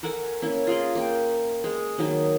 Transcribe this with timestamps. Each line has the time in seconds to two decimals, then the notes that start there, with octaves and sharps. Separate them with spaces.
0.03 A4 A#4 F#5 G#5
0.42 A#3 C#4 E4
0.67 F4 G#4 A#4 D#5
0.95 A#3 G5
1.64 G#3
1.98 D#3 F#3 A#3 D#4